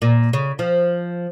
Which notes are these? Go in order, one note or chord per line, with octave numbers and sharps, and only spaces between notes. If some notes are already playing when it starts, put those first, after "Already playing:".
A#2
C#3
F3